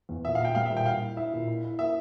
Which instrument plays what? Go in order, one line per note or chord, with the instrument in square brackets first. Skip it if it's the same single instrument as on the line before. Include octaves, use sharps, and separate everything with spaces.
[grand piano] E2
[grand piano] A#2 [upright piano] E5
[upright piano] F5
[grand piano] A#2 [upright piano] G5
[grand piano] G3 [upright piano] F5
[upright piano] E5
[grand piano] A#2
[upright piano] G5
[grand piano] A#2 [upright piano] F5
[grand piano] E4
[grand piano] E4 [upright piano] E5
[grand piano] A#2
E4
E4
[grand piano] A#3 [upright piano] E5